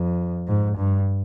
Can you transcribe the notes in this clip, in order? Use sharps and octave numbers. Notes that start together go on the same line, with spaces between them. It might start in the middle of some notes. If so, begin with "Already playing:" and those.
Already playing: F2
G#2
G2